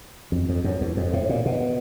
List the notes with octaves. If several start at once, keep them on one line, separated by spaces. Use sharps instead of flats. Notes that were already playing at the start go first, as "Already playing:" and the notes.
F2
F2
F#2
E2
F2
A2
A#2
B2